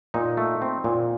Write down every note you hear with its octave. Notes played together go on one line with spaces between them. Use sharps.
A#2 D#4
A3
C4
A#2